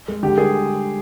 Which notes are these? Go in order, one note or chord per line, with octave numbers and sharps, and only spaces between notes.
G#3
D3 G4
G3 G#4